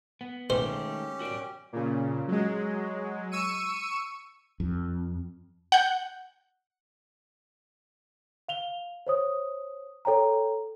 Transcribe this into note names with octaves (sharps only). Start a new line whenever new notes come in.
B3
D#3 G#3 A3 C#4 G4 C5
F#4 A#4 D5
A#2 C#3
F#3 G#3
C#6 E6 C#7 D#7
F2
F#5 G6
F5 F7 G7
C5 C#5 D#6
A4 C#5 G5 A#5